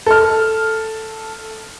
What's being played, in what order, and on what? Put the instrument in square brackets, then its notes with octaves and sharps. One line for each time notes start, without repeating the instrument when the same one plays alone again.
[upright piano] A4 F6